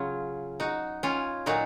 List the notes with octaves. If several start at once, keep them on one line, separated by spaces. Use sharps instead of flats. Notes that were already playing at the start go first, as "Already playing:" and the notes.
Already playing: C#3 F#3 C#4 F4
D#4 F#4
C#4 F4
A#2 F#3 D#4 F#4